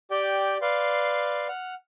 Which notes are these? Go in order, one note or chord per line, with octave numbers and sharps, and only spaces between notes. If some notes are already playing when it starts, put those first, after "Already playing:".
G4 D5 G5
B4 D5 F5 C6
F#5 F6